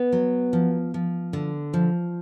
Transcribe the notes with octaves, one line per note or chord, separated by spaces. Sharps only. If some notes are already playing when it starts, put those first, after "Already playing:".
Already playing: B3
F#3
F3
F3
D3
F3